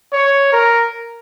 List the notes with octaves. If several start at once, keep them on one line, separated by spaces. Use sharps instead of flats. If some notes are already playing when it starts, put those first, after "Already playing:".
C#5
A#4